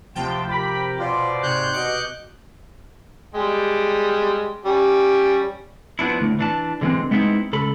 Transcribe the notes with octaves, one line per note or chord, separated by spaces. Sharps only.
D2 C3 F3 F4 G5 A5
G4 A#4 B5 D6
B2 F4 B4 C5 D5 D6
G#2 C3 C#5 F#6 G6
B2 D#5 D6 C#7
G3 G#3 G4
G3 C#4 G4
F3 B3 D4 E4
D2 A2
E3 D4 A5
D3 E3 G#3 A#3 C4
G#3 B3 C4 D#4 E4
C#2 A4 B5